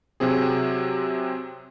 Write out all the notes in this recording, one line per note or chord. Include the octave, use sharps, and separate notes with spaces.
C3 F#3 C4 G#4